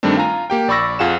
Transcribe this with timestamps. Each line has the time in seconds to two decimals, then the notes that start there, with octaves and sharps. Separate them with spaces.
0.03 G2 D#3 G3 A3 C4 D4
0.17 F4 G#5 A#5
0.50 A#3 G4 G5
0.68 A#1 D5 B5 C#6 E6 A#6
0.99 F2 F4 G#4 F#5 E7